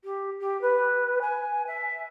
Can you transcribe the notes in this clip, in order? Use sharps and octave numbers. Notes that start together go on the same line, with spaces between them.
G4
G4
B4
G#5
E5